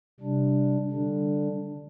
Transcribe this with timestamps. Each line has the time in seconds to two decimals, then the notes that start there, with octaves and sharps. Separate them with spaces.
0.20 C3 G3 D4
0.91 D3 G3 D4